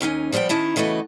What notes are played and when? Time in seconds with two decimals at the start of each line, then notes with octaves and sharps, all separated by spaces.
0.01 D#2 C#4 D#4 G#5
0.32 F3 G3 B3 F#5 G5
0.49 D#3 C#4 D#4 E4 A5
0.76 C#3 E3 A3 B3 F#4 D#5